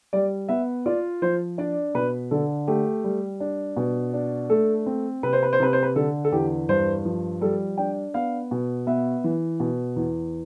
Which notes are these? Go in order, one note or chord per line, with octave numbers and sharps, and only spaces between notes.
G3 D5
B3 E5
F4 D5
F3 C5
D4 D5
B2 B4
D3 A4
A3 G4
G3
D4
B2
D4
A3 A4
C4
C3 B4
C5
B4
C5
C3 B4
C5
B4
D3 A4
A4
E2 G4
G2 C5
F3
G3 A4
D4 G5
B3 F5
B2
B3 E5
E3
B2
E2